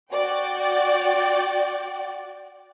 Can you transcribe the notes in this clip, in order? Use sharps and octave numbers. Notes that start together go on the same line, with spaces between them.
F#4 D5 G5